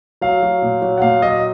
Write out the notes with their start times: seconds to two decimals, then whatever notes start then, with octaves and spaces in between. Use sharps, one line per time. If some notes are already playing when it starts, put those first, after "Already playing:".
0.21 F#3 F5
0.43 F#3
0.62 A#2
0.82 F#3
0.98 F#5
1.02 A#2 F5
1.22 F#3 D#5